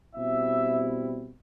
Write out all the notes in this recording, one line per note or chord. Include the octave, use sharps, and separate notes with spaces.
B2 G3 C4 E4 E5